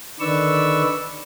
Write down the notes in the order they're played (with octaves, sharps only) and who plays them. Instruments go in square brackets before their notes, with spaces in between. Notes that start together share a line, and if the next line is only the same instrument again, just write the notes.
[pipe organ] D3 D#3 B4 D5 C#6 E6